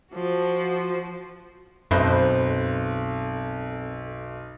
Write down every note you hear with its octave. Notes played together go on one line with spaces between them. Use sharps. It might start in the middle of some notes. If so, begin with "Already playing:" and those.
F3 F#4
B1 F#2 C4 A4 B4 C5 D#5